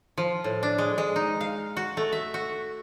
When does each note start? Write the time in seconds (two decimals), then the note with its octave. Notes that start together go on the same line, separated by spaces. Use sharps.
0.18 F3
0.44 A2
0.63 D4
0.78 G#3
0.98 G#3
1.16 D#4
1.41 F5
1.77 F#4
1.97 A3
2.12 E5
2.34 F#4